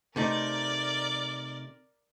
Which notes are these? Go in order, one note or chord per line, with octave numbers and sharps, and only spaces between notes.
C3 A3 D#4 A#4 D5